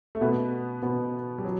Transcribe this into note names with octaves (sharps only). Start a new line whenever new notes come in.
A3
B2 B3
B2 B3
G3
F#3